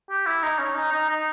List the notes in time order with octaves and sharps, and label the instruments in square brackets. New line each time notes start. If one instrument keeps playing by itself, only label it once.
[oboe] G4
E4
D#4
C#4
D#4
D#4
D#4